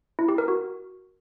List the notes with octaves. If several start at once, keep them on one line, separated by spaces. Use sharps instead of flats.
E4
G4
A#4
F#4